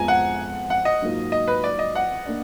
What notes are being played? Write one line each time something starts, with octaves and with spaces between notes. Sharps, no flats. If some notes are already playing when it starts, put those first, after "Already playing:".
Already playing: F2 F3 G#3 B3 F4 G#5 A#5
F#5
F#5
D#5
G#2 F#3 A#3 F4
D#5
B4
D5
D#5
F#5
A#3 D4